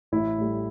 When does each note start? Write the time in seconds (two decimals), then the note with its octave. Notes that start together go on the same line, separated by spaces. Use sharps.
0.12 A1 E4
0.38 A2 G3